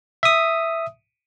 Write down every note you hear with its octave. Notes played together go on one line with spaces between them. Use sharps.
E5 D#6